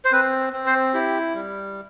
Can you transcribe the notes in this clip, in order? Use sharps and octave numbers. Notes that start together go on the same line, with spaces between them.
C5
C4 B4
C4
C5
E4 G4
G3